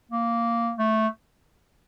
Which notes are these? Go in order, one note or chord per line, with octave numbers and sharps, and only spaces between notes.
A#3
A3